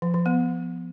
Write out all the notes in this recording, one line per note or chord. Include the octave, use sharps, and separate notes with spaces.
F3
F3
B3